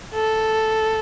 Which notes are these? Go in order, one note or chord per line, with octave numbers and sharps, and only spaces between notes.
A4